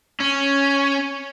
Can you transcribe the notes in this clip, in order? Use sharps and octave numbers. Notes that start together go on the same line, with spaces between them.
C#4